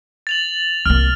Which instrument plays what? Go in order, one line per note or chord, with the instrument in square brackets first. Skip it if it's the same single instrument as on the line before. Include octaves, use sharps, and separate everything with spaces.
[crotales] A6 F7 F#7
[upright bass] C2 A#3 [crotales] F6